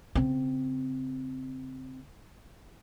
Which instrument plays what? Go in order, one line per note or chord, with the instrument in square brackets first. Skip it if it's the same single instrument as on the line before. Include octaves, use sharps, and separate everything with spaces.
[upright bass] C#3 C4